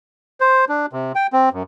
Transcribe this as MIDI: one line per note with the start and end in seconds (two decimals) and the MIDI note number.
0.40 0.65 72
0.69 0.86 62
0.93 1.12 48
1.15 1.27 79
1.33 1.49 60
1.53 1.63 42